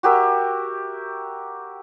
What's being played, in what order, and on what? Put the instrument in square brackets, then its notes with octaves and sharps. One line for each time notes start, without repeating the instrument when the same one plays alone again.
[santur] F#4 G4 A#4 E5